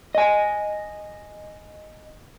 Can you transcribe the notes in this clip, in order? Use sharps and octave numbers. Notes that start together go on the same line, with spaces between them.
D#5 G#5